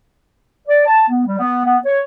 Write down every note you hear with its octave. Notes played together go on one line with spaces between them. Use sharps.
D5
A5
B3
G3
B3
B3
C#5